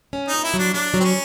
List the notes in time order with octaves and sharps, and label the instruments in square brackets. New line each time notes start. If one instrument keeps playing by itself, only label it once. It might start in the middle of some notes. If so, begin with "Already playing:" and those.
[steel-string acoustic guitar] C#4
[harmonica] D#4
[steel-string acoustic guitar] A#2
[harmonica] E4
[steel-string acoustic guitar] F#3
[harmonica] D4
[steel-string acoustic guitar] F#3 [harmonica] D4
[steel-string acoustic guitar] F#3
[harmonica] C4
C#4